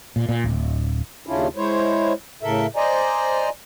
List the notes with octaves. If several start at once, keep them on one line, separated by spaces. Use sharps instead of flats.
A#2
A#2
D1
D#2 C#3 C#4 D4 E4 F4
G#3 E4 C5 C#5
A2 C#3 A4 A#4 E5
C5 D5 D#5 G#5 A#5